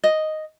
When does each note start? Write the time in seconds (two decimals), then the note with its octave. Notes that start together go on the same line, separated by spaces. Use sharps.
0.04 D#5